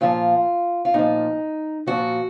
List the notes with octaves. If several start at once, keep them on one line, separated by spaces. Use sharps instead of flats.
A#2 F3 F4
F4
A#2 F3 D#4
A#2 F3 F#4